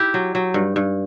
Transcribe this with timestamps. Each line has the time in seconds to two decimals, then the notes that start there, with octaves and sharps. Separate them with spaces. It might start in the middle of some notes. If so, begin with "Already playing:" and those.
Already playing: E4 G4
0.14 F#3
0.35 F#3
0.54 G2
0.76 G2